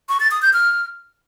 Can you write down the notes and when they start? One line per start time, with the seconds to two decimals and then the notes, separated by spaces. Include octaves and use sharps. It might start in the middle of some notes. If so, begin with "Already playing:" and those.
0.09 C#6
0.20 A6
0.31 D#6
0.42 G6
0.53 F6